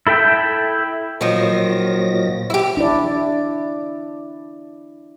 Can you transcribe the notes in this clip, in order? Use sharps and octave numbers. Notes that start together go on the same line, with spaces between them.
E4 A4 E5 G5 G6
A#2 D#3 F3 F#3 A#6
E4 G4
D4 E4 D5